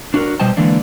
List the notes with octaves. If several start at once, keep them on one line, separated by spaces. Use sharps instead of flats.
D4 F#4 A#4
B2 G3 C5 D#5 G5 A5
D3 E3 G#3 A#3 D4